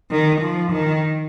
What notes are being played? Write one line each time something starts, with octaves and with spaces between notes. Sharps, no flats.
D#3
F3
D#3